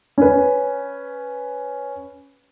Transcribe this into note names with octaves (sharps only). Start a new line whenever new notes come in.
C#4 B4